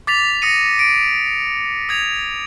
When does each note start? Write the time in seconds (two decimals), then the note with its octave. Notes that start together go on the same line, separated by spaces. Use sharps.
0.07 D6 A6 B6 F7
0.42 D#6 A#6 C#7 D#7
0.79 D7
1.89 D#6 G#6 F7